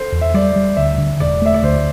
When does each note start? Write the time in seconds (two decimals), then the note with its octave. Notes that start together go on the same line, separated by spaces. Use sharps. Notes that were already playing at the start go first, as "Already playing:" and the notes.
Already playing: A4 C5
0.12 E2
0.21 E5
0.34 G3 D5
0.56 G3
0.77 D2 E5
0.98 D3
1.20 E1 D5
1.42 A3 E5
1.54 D5
1.63 D2 C5